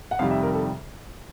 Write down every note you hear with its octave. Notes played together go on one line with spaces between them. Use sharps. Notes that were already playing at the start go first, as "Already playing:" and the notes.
F#5
F2 C3 D#3 G3 F5
E5
A#4
A4